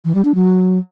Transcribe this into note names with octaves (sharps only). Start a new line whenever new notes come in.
E3
G3
D4
F#3